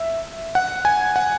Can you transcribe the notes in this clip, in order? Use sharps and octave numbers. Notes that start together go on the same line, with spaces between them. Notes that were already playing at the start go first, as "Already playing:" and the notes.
Already playing: E5
F#5
G#5
F#5